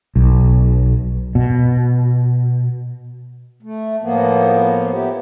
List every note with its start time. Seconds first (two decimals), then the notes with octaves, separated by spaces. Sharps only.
0.16 B1
1.35 B2
3.63 A3
4.02 A2 F3 A#3 B3
4.93 B3 E4 G4